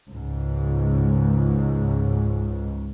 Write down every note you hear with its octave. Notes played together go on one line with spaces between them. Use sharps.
C#2 G#2